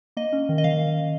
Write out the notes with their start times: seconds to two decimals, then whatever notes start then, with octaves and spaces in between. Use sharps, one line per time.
0.17 A#3 D#5
0.33 C#4
0.49 D#3
0.58 D#5
0.64 D#3 F5